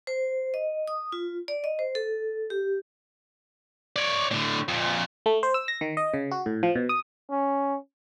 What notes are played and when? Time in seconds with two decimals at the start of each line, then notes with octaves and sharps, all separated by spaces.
0.07 C5
0.54 D#5
0.88 D#6
1.12 F4
1.48 D5
1.64 D#5
1.79 C5
1.95 A4
2.50 G4
3.96 C#5 D5
4.31 A2 D3
4.69 F2 A#2
5.26 A3
5.43 C5
5.54 E6
5.68 A#6
5.81 D#3
5.97 D#5
6.14 C#3
6.31 F#4
6.46 A2
6.63 F3
6.75 B2
6.89 D#6
7.31 C#4